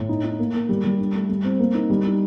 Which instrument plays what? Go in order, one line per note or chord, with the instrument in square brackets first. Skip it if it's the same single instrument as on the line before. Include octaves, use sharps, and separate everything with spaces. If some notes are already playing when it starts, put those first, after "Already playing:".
Already playing: [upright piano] A2
D#4
D#4
A#3
A#3
G3
G3
D4
A3
G3
C4
A#3
D#4
G3
D#4